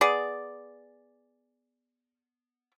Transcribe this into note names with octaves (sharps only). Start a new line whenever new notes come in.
B3 G#4 D5